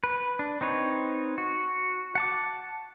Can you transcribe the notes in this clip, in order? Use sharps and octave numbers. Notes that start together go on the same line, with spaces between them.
B4
D4
C4 D#4 B4 C#5
F#4
F#5 A5 D6